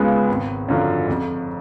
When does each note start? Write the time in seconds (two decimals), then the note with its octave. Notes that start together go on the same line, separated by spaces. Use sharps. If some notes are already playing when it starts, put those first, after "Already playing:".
Already playing: C#2 C#3 G#3 B3 F4
0.29 G#1
0.68 F#2 D3 F3
1.08 F2